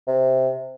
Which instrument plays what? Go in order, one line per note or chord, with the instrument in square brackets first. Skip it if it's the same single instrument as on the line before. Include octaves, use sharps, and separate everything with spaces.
[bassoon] C3